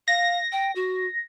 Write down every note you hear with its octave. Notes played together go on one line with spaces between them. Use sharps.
F5 A#6
G5
F#4